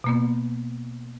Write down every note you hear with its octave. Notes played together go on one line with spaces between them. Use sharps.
B2 A#3 B3